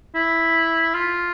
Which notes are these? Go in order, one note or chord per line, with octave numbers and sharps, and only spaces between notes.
E4
F4